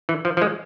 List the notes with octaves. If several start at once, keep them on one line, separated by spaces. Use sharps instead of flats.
E3
F3
F3
G#3